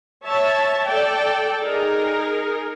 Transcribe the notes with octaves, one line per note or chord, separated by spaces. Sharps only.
C#5 E5 A5
A4 D5 G5
D#4 G#4 A#4